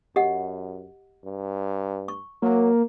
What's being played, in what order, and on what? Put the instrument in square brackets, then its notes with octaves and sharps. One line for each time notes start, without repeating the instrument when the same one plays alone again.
[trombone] F#2 [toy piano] G4 D#5 F#5
[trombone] G2
[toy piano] C#6
[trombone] F#3 [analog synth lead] A#3